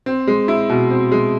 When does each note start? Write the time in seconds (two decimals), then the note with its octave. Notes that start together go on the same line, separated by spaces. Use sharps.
0.06 C4
0.27 G#3
0.48 E4
0.69 B2
0.90 C4
1.12 G#3